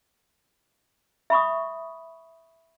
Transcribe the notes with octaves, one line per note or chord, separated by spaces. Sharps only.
E5 B5 C#6 D#6